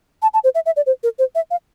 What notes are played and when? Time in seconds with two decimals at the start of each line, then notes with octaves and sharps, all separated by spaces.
0.22 A5
0.34 A5
0.44 C5
0.55 E5
0.66 E5
0.76 D5
0.86 C5
1.03 A#4
1.19 C5
1.35 E5
1.51 F5